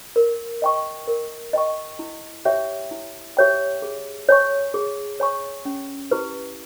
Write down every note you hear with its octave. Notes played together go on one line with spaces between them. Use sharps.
A#4
D#5 G5 C#6
A#4
D#5 G5 C#6
E4
G4 C#5 E5 G5
E4
G4 C#5 E5 G5
G#4
C#5 G#5 C#6
G#4
C#5 G#5 C#6
C#4
E4 G4 B4